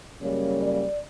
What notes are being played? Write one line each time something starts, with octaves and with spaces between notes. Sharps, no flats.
F#2 C#3 G3 A#3 C#5
D5